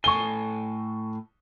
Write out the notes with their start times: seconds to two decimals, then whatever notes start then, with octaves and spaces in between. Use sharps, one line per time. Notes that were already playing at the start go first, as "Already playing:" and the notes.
0.04 A2 A4 G#5 C#6 G7